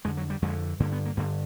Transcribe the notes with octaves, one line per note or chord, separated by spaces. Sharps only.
F2 D3 G#3
F#3
G3
F2 D3 G#3
G2 D3 A#3
B3
A#3
G2 D3 A#3